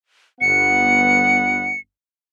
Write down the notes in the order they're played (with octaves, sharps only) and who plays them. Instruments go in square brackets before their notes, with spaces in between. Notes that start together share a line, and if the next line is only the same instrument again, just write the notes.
[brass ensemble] G1 B3 F#5 [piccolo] C#7